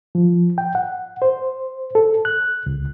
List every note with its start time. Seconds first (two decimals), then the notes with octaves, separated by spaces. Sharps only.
0.15 F3
0.58 G5
0.75 F#5
1.22 C5
1.95 A4
2.25 F#6
2.66 C#2